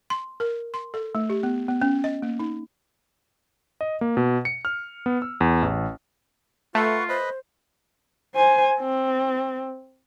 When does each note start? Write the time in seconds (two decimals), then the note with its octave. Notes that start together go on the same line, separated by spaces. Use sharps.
0.10 C6
0.40 A#4
0.74 C6
0.94 A4
1.15 A3
1.30 G4
1.43 B3
1.68 B3
1.82 C#4
2.04 D#5
2.22 A#3
2.39 D#4
3.81 D#5
4.01 A#3
4.17 B2
4.45 C#7
4.65 F6
5.06 B3
5.22 E6
5.41 E2
5.62 A1
6.75 A3 F4 B4 F#5 C#6
7.09 B4 C5 D#5 B5
8.35 C5 G#5
8.80 C4